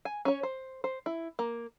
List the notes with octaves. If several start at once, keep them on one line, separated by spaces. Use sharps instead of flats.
G#5
C#4 C#5
C5
C5
E4
A#3